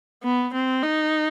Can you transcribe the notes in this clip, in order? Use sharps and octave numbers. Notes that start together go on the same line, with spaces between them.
B3
C4
D#4